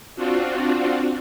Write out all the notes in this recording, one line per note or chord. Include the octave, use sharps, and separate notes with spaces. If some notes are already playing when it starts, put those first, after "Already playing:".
C4 D4 F4 F#4